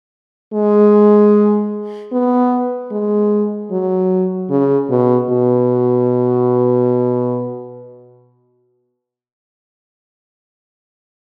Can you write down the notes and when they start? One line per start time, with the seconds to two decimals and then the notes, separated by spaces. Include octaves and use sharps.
0.53 G#3
2.12 B3
2.91 G#3
3.72 F#3
4.50 C#3
4.90 B2
5.30 B2